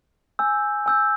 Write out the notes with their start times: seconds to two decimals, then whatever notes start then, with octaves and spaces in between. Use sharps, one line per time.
0.39 G#5 E6 G6
0.86 G#5 E6 G6